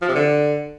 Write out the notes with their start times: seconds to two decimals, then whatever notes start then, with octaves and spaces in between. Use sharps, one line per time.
0.02 F3
0.09 C3
0.15 D3